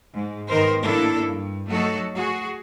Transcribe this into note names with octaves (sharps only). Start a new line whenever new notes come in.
G#2
G#2 D#3 B3 A#4 C5
A2 A#3 D4 E4 A4
G2
F#3 A3 D#4 F#4 A4
F#4 G#4